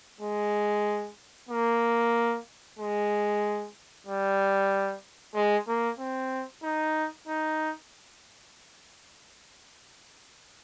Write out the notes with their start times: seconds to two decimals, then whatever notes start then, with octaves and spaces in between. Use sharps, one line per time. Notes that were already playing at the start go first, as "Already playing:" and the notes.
0.21 G#3
1.49 A#3
2.79 G#3
4.07 G3
5.35 G#3
5.68 A#3
5.99 C4
6.63 D#4
7.27 D#4